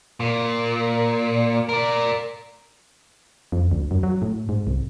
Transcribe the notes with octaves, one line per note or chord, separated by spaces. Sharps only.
A#2
A#4 D5
F2
D2
F#2
F#3
A2
G#2
C2